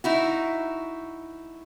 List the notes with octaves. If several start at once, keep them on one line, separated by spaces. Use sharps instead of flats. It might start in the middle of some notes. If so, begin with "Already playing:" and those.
D#4 E4 F#4